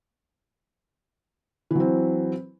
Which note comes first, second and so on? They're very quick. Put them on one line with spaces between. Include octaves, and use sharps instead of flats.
E3 F#3 C4